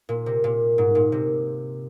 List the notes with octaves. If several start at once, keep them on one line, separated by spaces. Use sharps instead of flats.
A#2
C3
A#2
G#2
A#2
C3